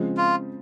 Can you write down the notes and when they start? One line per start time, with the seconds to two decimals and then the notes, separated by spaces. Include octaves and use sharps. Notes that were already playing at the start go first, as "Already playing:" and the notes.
Already playing: C#3 F3 G#3 C4
0.17 F4